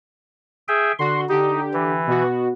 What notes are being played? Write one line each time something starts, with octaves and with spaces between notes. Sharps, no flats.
G#4 E5 G5
D3 F#4 C6
D3 D#4 G4
E3
B2 B3 F#4